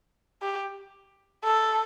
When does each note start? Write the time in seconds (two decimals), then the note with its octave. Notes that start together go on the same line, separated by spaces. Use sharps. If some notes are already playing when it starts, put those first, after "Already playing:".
0.42 G4
1.44 A4